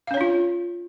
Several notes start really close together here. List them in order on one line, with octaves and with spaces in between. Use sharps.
F5 C#4 C#5 D4 F4